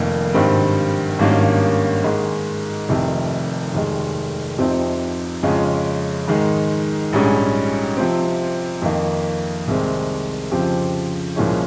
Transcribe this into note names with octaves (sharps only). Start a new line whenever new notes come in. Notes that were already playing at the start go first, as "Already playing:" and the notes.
Already playing: F1 F2 D#3 A#3
G#1 G2 D#3 G3 C4
G#1 G2 D#3 A#3 C#4
G#2 D#3 G#3
F1 F2 C3 D#3
F1 D#2 D#3 G#3
F2 C3 F3 C4 D#4
F2 C#3 G#3 C#4 F4
G#2 D#3 G#3 D#4
A#1 G#2 G3 C#4 G#4
C3 F3 C4
F2 D#3 A#3
C2 C3 D#3 G#3 C4
F2 C#3 F3 C4 G4
C2 A#2 F3 G#3 C#4